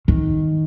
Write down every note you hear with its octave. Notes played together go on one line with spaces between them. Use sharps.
D#3